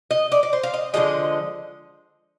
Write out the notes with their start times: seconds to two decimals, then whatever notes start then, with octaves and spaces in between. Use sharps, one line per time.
0.11 D#5
0.32 D5
0.43 D5
0.53 C5
0.63 F5
0.74 D#5
0.94 D3 F3 G#3 D#5